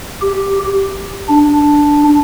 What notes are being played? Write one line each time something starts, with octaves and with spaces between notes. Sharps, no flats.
G4
D4